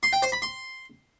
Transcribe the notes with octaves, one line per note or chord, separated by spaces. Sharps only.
C6
G5
C5
B5
C6